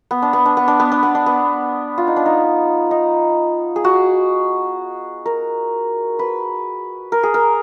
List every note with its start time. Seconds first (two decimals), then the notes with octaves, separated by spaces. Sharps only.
0.11 B3
0.22 D4
0.33 B3
0.46 D4
0.57 B3
0.68 D4
0.80 B3
0.92 D4
1.03 B3
1.15 D4
1.26 B3
1.98 F4
2.07 D#4
2.16 D4
2.26 D#4
2.91 D#4
3.76 G#4
3.85 F#4
5.26 A#4
6.19 B4
7.12 A#4
7.23 G#4
7.34 A#4